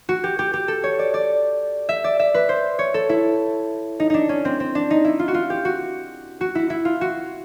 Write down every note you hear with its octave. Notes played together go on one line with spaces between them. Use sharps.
F#4
G4
G4
G4
A4
C#5
D5
D5
E5
D5
E5
B4
C5
C#5
A4
E4
D#4
D4 D#4
C#4
C4
C4
D4
D#4
E4
F4
F#4
F4
G4
F#4
F#4
E4
E4
F4
F#4